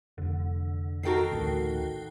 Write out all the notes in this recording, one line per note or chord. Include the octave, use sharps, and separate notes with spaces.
F1 D3
D#3 F#4 A4 A#4 G5 C7
A1 D2 A2